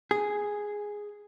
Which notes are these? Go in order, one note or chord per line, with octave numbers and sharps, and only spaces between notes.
G#4